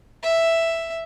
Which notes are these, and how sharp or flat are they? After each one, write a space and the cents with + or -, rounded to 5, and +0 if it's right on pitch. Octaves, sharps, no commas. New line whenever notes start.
E5 +5